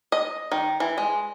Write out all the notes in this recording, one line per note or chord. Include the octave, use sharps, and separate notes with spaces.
D#5
D#3
E3
G#3